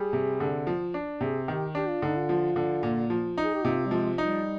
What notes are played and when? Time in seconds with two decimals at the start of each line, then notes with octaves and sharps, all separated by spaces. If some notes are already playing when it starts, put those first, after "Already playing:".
Already playing: G3 G#4
0.13 C3
0.40 D3
0.67 F3
0.94 D4
1.21 C3 G#4
1.48 D#3 G4
1.75 D4 G4
1.89 F4
2.02 D3 D#4
2.17 F4
2.29 F3
2.56 D3
2.83 A#2
3.10 F3
3.38 D#4
3.44 G#4
3.54 G4
3.64 C3 F4
3.86 G3
3.91 F3 G#3
4.18 G3 D#4